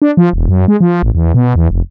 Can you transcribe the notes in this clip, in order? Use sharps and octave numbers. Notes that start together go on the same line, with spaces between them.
D4
F3
E1
F#2
G#3
F3
A1
E2
B2
E2
F1